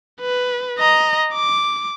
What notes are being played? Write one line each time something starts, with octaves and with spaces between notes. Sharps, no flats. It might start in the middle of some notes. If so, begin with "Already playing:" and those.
B4
D#5 A#5
D6